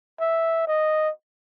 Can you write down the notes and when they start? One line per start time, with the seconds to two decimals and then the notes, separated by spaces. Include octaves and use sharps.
0.20 E5
0.67 D#5